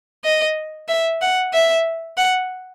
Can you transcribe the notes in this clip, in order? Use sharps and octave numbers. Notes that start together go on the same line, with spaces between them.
D#5
E5
F#5
E5
F#5